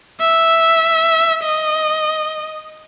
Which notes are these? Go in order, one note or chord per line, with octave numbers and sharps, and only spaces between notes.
E5
D#5